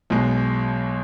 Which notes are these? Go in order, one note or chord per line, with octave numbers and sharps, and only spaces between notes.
B1 B2 G#3